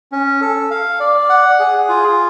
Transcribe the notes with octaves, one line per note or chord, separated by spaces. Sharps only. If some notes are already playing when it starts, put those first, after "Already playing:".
C#4
A4
F5
D5
F#5
G#4
F4